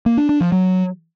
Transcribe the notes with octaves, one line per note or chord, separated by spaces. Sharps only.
A#3
D4
D4
F3
F#3